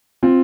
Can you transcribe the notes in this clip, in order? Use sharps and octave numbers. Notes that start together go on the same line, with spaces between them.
C4 F4